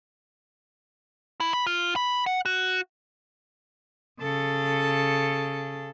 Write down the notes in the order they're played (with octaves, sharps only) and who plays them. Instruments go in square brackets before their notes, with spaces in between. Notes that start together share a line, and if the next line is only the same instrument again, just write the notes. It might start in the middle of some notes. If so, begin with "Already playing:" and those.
[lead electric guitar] E4
B5
F4
B5
F#5
F#4
[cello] C#3 A4